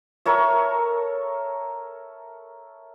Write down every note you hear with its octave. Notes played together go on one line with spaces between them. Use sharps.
A4 A#4 C#5 E5